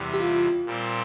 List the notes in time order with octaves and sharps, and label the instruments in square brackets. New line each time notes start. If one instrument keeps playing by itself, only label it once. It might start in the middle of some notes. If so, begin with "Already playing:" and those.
Already playing: [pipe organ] E2 C3 E3 G3
[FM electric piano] G4
F4
[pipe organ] A#2 G3 C4